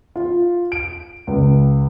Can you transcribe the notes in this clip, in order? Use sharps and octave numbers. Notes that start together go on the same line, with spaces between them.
F4
D7
C#2